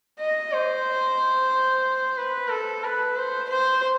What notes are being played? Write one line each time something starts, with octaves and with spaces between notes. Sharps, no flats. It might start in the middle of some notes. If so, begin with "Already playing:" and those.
D#5
C5
B4
A4
B4
C5
C5